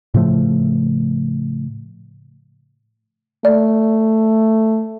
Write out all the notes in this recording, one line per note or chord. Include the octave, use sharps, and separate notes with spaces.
A2 C#3 F3 A3
A3 D5